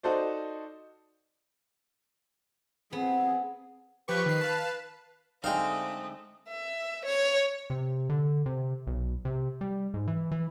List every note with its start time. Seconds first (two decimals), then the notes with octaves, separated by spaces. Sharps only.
0.03 D#4 F#4 A4 C5 D5
2.93 B3 C4 G#4
4.08 F3 G4 B4 C#6
4.26 D#3 C7
4.41 F5 A5
5.44 D3 G#3 A3 C4 D#4 F5 G5 D#6
6.49 E5
7.06 C#5
7.70 C3
8.10 D3
8.46 C3
8.87 B1
9.25 C3
9.61 G3
9.94 G#2
10.08 E3
10.32 E3